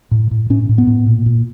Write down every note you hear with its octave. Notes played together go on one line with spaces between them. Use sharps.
A2
A2
A2 C#4
A2
B3
A2
A#2
A#2